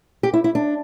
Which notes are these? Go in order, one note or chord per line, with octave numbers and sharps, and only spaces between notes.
G4
E4
E4
D4